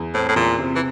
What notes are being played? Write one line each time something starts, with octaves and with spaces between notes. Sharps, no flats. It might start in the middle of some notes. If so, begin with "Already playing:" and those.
Already playing: E2
A2 C4
A2
E2 A#2
C3
E3